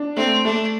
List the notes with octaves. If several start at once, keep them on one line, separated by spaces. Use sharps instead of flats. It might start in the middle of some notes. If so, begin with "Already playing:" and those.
Already playing: D4
A3 C4
A3 D4